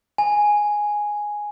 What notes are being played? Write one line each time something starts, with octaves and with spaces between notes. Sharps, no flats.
G#5